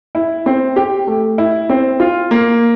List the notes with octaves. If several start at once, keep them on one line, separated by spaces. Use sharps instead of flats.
E4
C4
G4
A3
E4
C4
F4
A#3